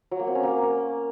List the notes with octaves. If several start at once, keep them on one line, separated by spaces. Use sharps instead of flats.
F#3
A#3
C4
C#4
A#3